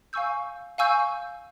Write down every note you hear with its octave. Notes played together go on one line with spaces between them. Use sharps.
F5 G#5 C#6 E6 G6
F5 G#5 C#6 E6 G6